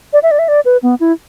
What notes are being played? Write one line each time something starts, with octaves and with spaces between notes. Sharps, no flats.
D5
E5
D5
E5
D5
B4
B3
E4